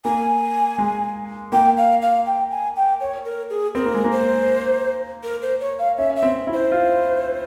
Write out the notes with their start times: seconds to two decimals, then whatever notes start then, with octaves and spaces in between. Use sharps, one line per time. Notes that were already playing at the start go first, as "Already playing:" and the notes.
0.05 A#3 G#5
0.78 G#3
1.52 A#3 G5
1.77 F5
2.02 F5
2.26 G5
2.51 G#5
2.76 G5
3.00 C#5
3.25 A#4
3.50 G#4
3.75 C4 A#4
3.85 A#3
3.94 G#3
4.04 A#3
4.12 C5
5.23 A#4
5.42 C5
5.60 C#5
5.79 F5
5.98 C#4 E5
6.16 E5
6.23 C4
6.47 E4
6.53 C5
6.72 F4